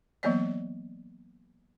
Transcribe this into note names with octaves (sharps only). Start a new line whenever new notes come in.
E3 F#3 A#3 B3 C#5 D5